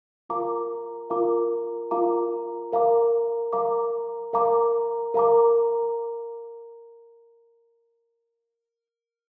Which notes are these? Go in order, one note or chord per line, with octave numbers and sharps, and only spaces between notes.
F4 A#4 F5 A#5 D6
F4 A#4 F5 A#5 D6
F4 A#4 F5 A#5 D6
A#4 F5 A#5 D6
A#4 F5 A#5 D6
A#4 F5 A#5 D6
A#4 F5 A#5 D6